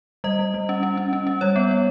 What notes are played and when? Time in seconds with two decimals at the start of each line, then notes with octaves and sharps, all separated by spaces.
0.24 G3 D#5
0.39 G3
0.54 G3
0.69 C#4
0.83 C#4
0.97 C#4
1.13 C#4
1.27 C#4
1.41 G3 C#5
1.56 B3
1.71 B3